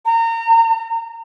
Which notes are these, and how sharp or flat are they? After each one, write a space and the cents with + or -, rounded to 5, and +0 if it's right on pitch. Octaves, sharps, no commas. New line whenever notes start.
A#5 -30